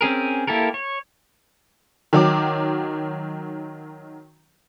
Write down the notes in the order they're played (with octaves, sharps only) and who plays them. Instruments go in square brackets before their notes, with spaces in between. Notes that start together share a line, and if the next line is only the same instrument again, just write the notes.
[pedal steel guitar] C4 C#4 G#4 A#4
A#3 E4 G4 A4 A#4
C#5
[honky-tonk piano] D#3 F#3 D6